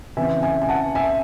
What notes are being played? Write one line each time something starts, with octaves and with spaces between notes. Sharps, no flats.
C#3 E3 C4 E5 G#5
E5 G#5
G#5
F#5 A5
E5 G#5